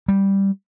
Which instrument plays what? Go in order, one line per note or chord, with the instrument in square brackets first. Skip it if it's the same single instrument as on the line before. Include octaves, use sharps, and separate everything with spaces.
[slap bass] G3